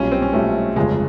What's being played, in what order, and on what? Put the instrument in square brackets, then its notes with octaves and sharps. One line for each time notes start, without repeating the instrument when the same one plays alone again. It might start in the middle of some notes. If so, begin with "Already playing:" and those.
Already playing: [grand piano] B1 A#2 G3 [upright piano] C#4
[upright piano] C4
C#4
[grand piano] B1 A#2 G3 [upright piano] A3
[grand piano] G1 F2 C#3 [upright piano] G#3